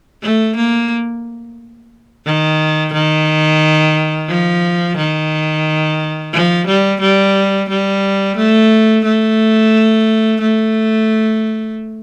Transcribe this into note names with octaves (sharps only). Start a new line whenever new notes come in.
A3
A#3
D#3
D#3
F3
D#3
F3
G3
G3
G3
A3
A3
A3